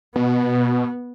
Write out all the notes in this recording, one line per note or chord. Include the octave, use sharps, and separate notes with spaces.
B2 B3